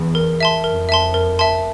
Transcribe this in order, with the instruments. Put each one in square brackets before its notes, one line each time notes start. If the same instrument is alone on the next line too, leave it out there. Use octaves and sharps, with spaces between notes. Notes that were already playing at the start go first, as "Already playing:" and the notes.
Already playing: [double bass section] E2
[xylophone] A#4
E5 A5 C6
[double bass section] F2 [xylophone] A#4
[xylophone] E5 A5 C6
A#4
E5 A5 C6